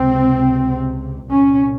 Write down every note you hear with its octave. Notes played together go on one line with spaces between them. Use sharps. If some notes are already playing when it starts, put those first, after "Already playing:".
Already playing: C#2 C3 C4
C2 A#2 C#4